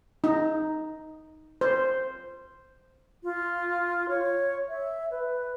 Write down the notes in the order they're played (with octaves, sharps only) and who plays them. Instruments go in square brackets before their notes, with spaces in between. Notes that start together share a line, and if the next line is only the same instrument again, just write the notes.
[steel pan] D#4
C5
[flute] F4
C#5
E5
B4